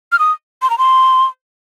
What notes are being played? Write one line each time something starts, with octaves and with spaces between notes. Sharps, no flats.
F6
D#6
C6
A#5
C6